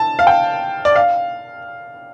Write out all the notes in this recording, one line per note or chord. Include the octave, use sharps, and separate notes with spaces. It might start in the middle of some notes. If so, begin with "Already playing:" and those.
Already playing: A5
F5
G5
D5
F5